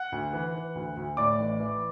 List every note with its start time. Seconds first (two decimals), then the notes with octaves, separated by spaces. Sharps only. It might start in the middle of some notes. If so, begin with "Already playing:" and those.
Already playing: F#5 F#6
0.12 D2
0.33 E3
0.55 E3
0.75 D2
0.97 D2
1.17 A2 D5 D6
1.39 A1
1.60 E3